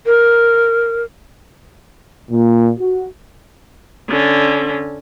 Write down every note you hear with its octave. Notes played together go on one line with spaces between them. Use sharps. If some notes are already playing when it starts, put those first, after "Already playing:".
A#4
A#2
F#4
D3 C#4